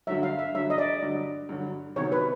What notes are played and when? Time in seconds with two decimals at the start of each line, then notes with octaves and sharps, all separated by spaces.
0.07 G2 D3 F#3 E5
0.23 F5
0.39 E5
0.55 G2 D3 F#3 E5
0.70 D#5
0.78 D5
1.02 G2 D3 F#3
1.49 G2 D3 F#3
1.96 C3 D#3 F#3 B3 C#5
2.12 B4